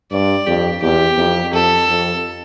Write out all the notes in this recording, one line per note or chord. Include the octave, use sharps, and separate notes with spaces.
G2 D5
F2 G4
E2 G4
F2
F2 A4
F2